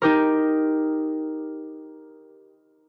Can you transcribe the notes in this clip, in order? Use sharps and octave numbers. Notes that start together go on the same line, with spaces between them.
D#4 G4 A#4